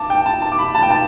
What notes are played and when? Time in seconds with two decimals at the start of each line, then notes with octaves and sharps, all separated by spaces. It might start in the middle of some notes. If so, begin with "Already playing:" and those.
Already playing: A5 D6
0.10 G5
0.26 A5
0.42 A5
0.52 D6
0.59 B5
0.75 A5
0.83 G5
0.91 A5